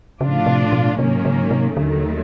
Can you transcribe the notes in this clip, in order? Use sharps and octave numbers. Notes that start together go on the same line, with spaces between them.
A2 C#3 F3 A3 D4 F4
C3
B2
G#2 C3 D#3 F#3 A#3 C#4
C#3
C3
D#2 D3 D#3 F#3 A3